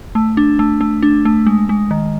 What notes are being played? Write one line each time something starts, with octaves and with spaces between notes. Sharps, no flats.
A3
D4
A3
A3
D4
A3
G#3
G#3
D#3